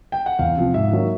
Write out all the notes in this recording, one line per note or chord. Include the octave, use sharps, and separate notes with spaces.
G5
F#5
E2 F5
C3 F3
G#2 E5
D#3 F#3 A#3